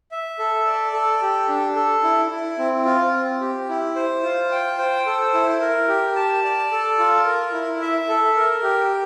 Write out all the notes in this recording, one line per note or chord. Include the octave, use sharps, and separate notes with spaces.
E5
A4
D5
A4
G4
D4
A4
E4
E4
C4
F4
C4
G4
E4
C5
F4
G5
C5
A4
E4
A#4
G4
A5
D5
A4
F4
A#4
E4
E5
A4
A#4
G4